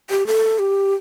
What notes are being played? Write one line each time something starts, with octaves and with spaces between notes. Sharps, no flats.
G4
A4
G4